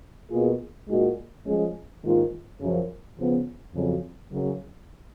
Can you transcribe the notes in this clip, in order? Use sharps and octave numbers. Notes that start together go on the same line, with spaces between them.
B2 A#3 F4 G#4
A#2 G#3 D#4 F#4
F3 G#3 C#4 G#4
G#2 D#3 A#3 F4
F#2 C#3 F3
C#3 F3 B3
F2 C#3 F#3
F#2 C#3 F#3